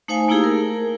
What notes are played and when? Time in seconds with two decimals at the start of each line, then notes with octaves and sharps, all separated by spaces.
0.08 A3 D#4 C5 F5 G#5
0.28 A3 A#3 D#4 E4 G4 G#4
0.44 A#4